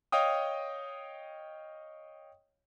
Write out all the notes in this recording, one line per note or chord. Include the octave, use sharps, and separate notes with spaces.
C#5 D#5 F5 G5 D#6